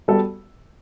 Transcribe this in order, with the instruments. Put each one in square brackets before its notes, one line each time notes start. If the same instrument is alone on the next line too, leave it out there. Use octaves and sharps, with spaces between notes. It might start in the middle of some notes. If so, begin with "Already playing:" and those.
[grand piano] G3 B3 F#4 A4